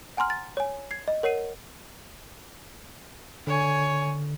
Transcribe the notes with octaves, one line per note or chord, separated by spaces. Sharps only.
F#5 G#5 A#5 C6 F6
A6
C#5 G#5
G#6 C7
D#5
A#4 C#5 F#5 C7 D#7
D3 C#5 G#5